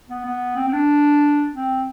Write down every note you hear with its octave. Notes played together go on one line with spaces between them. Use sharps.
B3
B3
C4
C4
D4
C4